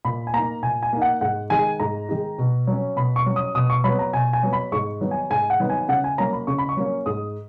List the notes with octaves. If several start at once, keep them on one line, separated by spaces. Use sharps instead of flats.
A#2 B5
G#5
A#3 D#4 A#5
A#2 G#5
G#5
A#3 D#4
F#5
G#2 F#5
D#3 G#3 D#4 G#5
G#2 A#5
D#3 G#3 D#4
B2
F#3 C#4
B2 B5
C#6
F#3 C#4
D#6
B2 D#6
C#6
F#3 B3 B5
A#5
B2 G#5
G#5
F#3 B3
B5
G#2 C#6
D#3 F#3 B3 D#4
G#5
G#2 G#5
F#5
D#3 F#3 B3 D#4
G#5
C#3 F#5
G#5
F#3 A#3 C#4 A#5
B5
C#3 C#6
B5
C#6
F#3 A#3 C#4
G#2 D#6